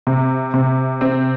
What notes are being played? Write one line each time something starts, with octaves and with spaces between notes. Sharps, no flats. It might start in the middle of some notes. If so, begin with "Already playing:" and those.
C3
C3
C4